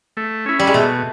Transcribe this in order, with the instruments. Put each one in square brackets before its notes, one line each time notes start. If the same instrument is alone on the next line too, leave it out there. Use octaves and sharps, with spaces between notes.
[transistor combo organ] A3
C#4 E4
[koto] G3
G#3
[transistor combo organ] B2 [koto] A3